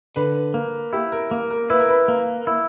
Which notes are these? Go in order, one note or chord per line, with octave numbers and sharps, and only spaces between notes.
D3 B4
A#3
E4 G4
A#4
A#3
A#4
E4 B4
A#4
B4
A#3
E4